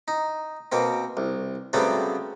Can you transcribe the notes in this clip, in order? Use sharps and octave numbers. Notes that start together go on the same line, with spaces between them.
D#4
B2 A#3 C4
C2
C#3 F#3 G3 A3 B3 C4